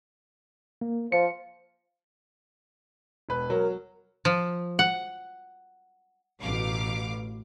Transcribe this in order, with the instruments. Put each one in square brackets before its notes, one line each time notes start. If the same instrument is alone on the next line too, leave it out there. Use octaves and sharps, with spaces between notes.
[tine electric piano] A#3
[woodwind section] F3 [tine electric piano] C#7
[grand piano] E1 B4
[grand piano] F#3 [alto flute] A#4
[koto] F3
F#5
[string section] A1 B2 F5 D6